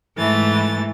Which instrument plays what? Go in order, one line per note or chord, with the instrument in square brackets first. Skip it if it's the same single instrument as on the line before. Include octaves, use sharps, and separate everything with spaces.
[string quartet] G#2 E3 A3 A6